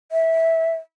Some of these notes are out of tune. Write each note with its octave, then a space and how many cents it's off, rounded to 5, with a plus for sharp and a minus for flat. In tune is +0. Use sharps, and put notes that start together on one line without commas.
E5 -15